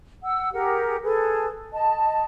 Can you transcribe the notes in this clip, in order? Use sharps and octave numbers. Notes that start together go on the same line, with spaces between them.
F#5 E6
G4 G#4 A#4 F#5
G#4 A4 B4
D#5 A5